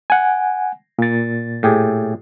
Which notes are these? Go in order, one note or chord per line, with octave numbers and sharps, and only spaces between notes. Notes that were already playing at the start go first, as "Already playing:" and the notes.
F#5 G#5
A#2 A6
A2 G4 G#4